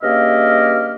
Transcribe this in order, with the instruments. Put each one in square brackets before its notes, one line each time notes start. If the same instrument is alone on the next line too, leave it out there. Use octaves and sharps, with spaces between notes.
[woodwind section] G2 C#3 A#3 D#5 E5 F6